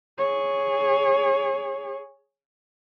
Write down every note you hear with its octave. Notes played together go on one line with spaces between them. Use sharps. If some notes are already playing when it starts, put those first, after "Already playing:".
G#4 C#5